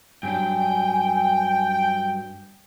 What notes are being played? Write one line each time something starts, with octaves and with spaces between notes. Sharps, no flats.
G2 F#3 D4 G5 G#5